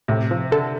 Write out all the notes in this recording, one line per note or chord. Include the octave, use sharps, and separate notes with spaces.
A2 C3
F3
D3 A4